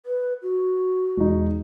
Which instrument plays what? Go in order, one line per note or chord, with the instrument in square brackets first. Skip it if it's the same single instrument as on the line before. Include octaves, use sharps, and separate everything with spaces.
[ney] B4
F#4
[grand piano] E1 D#4